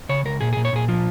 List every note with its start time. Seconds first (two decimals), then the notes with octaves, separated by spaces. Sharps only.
0.09 C#3 C#5
0.25 C#2 A#4
0.41 A#2 G#4
0.53 G#4
0.57 A#2
0.65 C#5
0.73 A#2 G#4
0.88 F3 F4